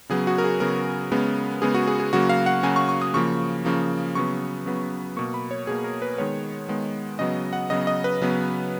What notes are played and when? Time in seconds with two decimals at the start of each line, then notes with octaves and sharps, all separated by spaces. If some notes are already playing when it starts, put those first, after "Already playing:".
0.09 C#3 F#3 B3 G#4
0.27 F#4
0.38 A#4
0.44 G#4
0.60 C#3 F#3 B3 A#4
1.12 C#3 G#3 B3
1.62 C#3 G#3 B3 G#4
1.74 F#4
1.87 G#4
2.00 G#4
2.13 C#3 F#3 A#3 F#4
2.29 F5
2.46 F#5
2.63 C#3 F#3 A#3 G#5
2.76 C#6
2.89 C#6
3.02 D#6
3.14 C#3 F3 A#3 C#6
3.65 C#3 F3 A#3
4.15 C#3 F#3 B3 C#6
4.66 C#3 F#3 B3
5.16 B2 A#3 C#6
5.34 B5
5.51 C#5
5.67 B2 A#3 G#4
5.84 A#4
6.02 B4
6.18 D#3 G#3 B3 C#5
6.69 D#3 G#3 B3
7.19 C#3 F#3 B3 D#5
7.53 F#5
7.70 C#3 F#3 B3 D#5
7.87 D#5
8.04 B4
8.21 C#3 F#3 B3